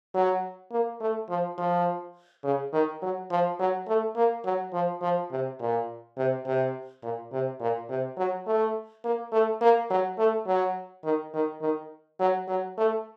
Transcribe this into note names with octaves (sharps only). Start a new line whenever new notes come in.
F#3
A#3
A3
F3
F3
C#3
D#3
F#3
F3
F#3
A3
A#3
F#3
F3
F3
C3
A#2
C3
C3
A#2
C3
A#2
C3
F#3
A3
A#3
A3
A#3
F#3
A3
F#3
D#3
D#3
D#3
F#3
F#3
A3